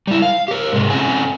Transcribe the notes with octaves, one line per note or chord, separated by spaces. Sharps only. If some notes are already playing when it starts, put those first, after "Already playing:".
G3 E4
F5
G4 A#4
G#2 C3 G#3
C4 C#4 A4 F#5 G#5